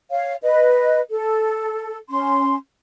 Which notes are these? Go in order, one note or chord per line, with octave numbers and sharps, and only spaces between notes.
C#5 F5
B4 D#5
A4
C#4 C6